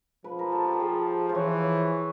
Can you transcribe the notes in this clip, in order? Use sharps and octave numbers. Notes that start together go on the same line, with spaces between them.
F3 B4
A#4
A4
G4
A4
G#4
C5
E3 C#5